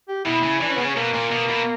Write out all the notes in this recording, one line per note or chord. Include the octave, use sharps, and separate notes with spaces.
G4
B2 E4
C#3
E3 D4
C#4
C#3 B3
C#4
B2 A#3
A#2
B2
B2